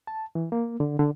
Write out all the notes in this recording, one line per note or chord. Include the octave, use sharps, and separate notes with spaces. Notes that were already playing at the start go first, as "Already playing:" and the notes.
A5
E3
A#3
D3
D3